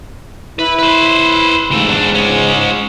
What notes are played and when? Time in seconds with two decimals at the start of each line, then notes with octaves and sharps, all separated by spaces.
0.59 E4 B4
0.79 B4 C5
1.71 G#2 E3 A3
1.89 E2 D4
2.15 G#3 C#4